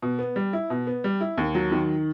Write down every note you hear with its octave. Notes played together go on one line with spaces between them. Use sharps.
B2
B3
G3
E4
B2
B3
G3
E4
D#2
F#3
D#3